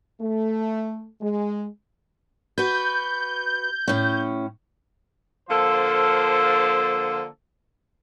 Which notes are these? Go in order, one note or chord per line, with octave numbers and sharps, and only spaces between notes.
A3
G#3
F#4 B4 G6
A2 C#4
D3 F3 A#3 A4 C5